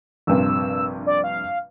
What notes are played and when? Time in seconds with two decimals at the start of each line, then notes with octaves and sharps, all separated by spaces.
0.27 A#1 G2 C3 E6
1.07 D5
1.24 F5